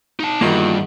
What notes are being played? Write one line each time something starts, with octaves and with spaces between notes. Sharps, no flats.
D#4 A5
E2 G2 D#3 A#3 F4 F#4